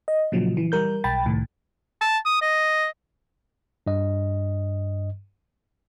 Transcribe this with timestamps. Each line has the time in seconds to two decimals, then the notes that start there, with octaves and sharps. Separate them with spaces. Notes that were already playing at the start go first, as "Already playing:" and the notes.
0.08 D#5
0.32 A#2 C#3 F3 F#3
0.57 E3
0.72 G3 A#4 G6
1.04 B1 G5 B5 A6
1.26 C2 A2 D#3
2.01 A5
2.25 D#6
2.42 D#5
3.87 G2 D#5